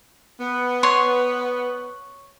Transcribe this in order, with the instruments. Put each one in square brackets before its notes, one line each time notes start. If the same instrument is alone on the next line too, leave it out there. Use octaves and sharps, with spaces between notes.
[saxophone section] B3
[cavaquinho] C#5 C6